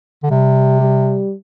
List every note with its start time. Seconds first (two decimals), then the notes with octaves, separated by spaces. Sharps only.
0.23 D3
0.30 C3 G3
0.81 G3